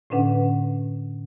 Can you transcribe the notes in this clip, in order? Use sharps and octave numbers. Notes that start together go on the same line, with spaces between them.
A2 D3 C#4 D4 B4 F#5